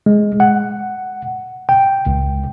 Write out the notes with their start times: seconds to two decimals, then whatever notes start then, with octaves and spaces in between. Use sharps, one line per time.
0.06 G#3
0.40 F#5
1.69 G5
2.07 C#2